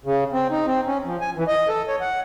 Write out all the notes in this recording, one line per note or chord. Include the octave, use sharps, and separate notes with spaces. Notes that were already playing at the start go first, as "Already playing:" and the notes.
C#3
C4
D#4
C4
C#4
F3
G#5
E3
D#5
A4
C#5
F#5